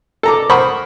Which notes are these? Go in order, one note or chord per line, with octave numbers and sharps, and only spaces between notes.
A4 A#5 D6
A#4 C5 F#5 B5 C#6 D#6